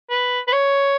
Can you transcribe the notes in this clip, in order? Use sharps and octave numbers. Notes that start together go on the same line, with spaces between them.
B4
B4
C#5